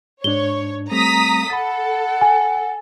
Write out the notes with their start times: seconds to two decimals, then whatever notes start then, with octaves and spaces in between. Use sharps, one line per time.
0.24 G#2 D4 C#5 G7
0.91 G3 A3 C4 A#5 D#6 B6
1.50 A4 F#5 B5 A6
2.21 G#5